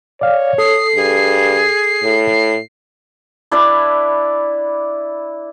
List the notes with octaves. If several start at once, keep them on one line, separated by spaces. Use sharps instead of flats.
C#5 D5 F5
A4 D#6 C7
G2 G#4
A2
D4 E4 B4 D5